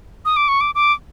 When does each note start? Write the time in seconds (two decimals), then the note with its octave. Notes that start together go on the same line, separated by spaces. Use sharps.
0.25 D#6
0.37 D6
0.48 C#6
0.61 D6
0.75 D6